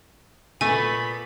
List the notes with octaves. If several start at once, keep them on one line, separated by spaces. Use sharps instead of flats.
A#2 A3 B3 G#5 B5